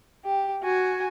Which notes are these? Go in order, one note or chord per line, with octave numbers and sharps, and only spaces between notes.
G4
F#4 G#5